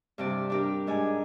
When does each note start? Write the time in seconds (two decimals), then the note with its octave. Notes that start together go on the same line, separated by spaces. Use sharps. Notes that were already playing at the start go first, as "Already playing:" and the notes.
0.18 G2 C3 D5
0.50 D4 G4 A#4
0.87 G#2 D4 G#5